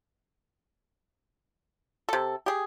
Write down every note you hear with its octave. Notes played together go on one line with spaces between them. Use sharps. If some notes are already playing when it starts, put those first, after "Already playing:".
C3 A4
G4 G#4